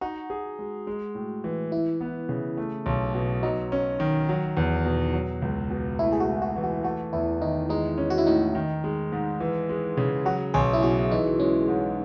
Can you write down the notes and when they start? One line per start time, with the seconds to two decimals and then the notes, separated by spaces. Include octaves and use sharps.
0.01 D#4 F#4
0.30 G#4
0.59 G#3
0.87 G#3
1.15 A2
1.44 E3
1.72 E3 E4
2.01 B3
2.29 C#3
2.57 A3
2.86 B1
3.14 B2
3.43 F#3 D#4
3.72 C#4
4.00 D#3
4.29 F#3
4.57 E2
4.85 B2
5.13 F#3
5.42 C#2
5.70 B2
5.99 A3 E4
6.13 G#4
6.20 F#4
6.28 G#2
6.42 F#4
6.56 E3
6.63 F#4
6.84 A3 F#4
7.13 E2 E4
7.41 D#3 D#4
7.69 G#3 D#4
7.98 C#4
8.10 F#4
8.18 E4
8.27 A2 D#4
8.55 D#3
8.84 G#3
9.12 G#2
9.40 E3
9.69 G#3
9.97 C#3
10.25 F#3 F#4
10.54 B1 G#4
10.73 E4
10.83 B2 F#4
11.11 E3 D#4
11.40 G#3 C#4
11.68 G#2